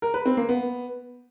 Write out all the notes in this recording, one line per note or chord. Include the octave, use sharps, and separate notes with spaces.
A#4
B4
C4
A#3
B3